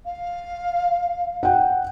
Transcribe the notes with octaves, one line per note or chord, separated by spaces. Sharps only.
F5
F#5 G5